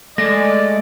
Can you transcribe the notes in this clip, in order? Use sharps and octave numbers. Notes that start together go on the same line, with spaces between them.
G#3 A3 D5 A#6